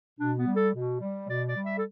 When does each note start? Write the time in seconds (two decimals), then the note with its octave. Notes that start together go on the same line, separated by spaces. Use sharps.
0.19 B2 D4
0.37 B3
0.46 G3
0.55 A4
0.73 B2
1.00 G3
1.28 B2 D5
1.47 D5
1.55 G3
1.64 E5
1.76 A4